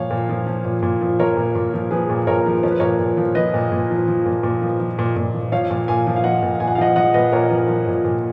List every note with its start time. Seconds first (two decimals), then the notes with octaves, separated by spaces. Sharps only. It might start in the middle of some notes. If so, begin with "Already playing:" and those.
Already playing: A#2 F3 C#5 F5
0.11 A#2
0.29 F3
0.46 F3
0.65 A#2
0.82 A#2
1.01 F3
1.19 F3 A#4 C#5
1.37 A#2
1.55 A#2
1.73 F3
1.91 F3 G#4 B4
2.10 A#2
2.27 A#2 A#4 C#5
2.46 F3
2.63 F3 C#5
2.71 B4
2.80 A#2 A#4 C#5
2.99 A#2
3.17 F3
3.35 F3 B4 D#5
3.54 A#2
3.72 A#2
3.90 F3
4.08 F3
4.26 A#2
4.43 A#2
4.62 F3
4.80 F3
4.99 A#2
5.16 A#2
5.34 F3
5.52 F3 C#5 F5
5.71 A#2
5.88 A#2 F5 G#5
6.07 F3
6.16 F5
6.24 F3 D#5 F#5
6.43 A#2
6.60 A#2 G#5
6.68 F#5
6.75 F5
6.78 F3 D#5 F#5
6.96 F3 D#5 F#5
7.14 A#2 B4 D#5
7.32 A#2 A#4 C#5
7.50 F3 A#4
7.68 F3
7.87 A#2
8.04 A#2